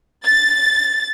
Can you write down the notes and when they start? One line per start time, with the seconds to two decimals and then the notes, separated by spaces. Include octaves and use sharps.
0.25 A6